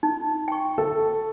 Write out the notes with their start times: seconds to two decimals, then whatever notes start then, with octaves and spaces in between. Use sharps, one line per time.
0.03 D#4
0.48 G5 C#6
0.78 A4